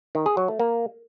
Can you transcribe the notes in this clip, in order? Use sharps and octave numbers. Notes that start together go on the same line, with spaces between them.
D#3
G#4
F#3
A3
A#3